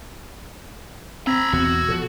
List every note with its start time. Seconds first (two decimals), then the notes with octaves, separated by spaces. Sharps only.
1.27 C4 A#5 B5 E6 G#6 A#6
1.53 E2 B2 F#4
1.88 B2 F3 A4